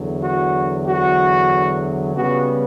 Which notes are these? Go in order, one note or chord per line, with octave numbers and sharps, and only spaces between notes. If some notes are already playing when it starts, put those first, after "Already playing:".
Already playing: E2 D3 F#3
F#4
F#4
C#3 G3 B3 F#4